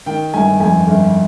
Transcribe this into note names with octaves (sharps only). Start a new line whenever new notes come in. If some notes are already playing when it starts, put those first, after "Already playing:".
D#3 G5
G1 G#5
F2 G#5
G1